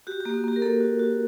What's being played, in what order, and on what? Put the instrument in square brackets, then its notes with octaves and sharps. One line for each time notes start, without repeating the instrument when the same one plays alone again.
[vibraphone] F#4 G4
G4
A#3
F#4
A#3 G4
A#4
A#3 A4
F#4
F#4